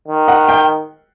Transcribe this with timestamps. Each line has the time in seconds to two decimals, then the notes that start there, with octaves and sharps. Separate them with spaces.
0.08 D#3
0.28 F#5
0.49 G5